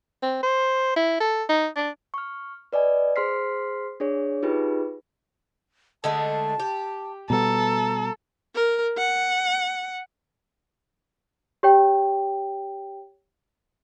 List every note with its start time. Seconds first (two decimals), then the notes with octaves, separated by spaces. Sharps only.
0.23 C4
0.43 C5
0.96 E4
1.20 A4
1.49 D#4
1.76 D4
2.14 C#6 F6
2.73 B4 D5 D#5 G#5
3.16 G#4 C5 C6 F6 B6 C7
4.00 D4 G#4 C#5
4.43 D#4 F4 G4 G#4 B4
6.04 D3 G#3 A3 A5
6.60 G4
7.30 B2 G3 B3 A4 A#5
8.55 A#4
8.98 F#5
11.63 G4 C#5 G5